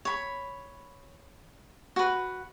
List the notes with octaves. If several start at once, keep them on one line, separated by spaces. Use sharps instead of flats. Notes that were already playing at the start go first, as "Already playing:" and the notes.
C#5 B5
F#4 B4